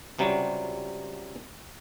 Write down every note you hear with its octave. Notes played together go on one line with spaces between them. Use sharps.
C#2 C3 F#3 G3